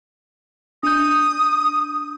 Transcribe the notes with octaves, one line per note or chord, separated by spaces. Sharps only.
D4 D#6 G6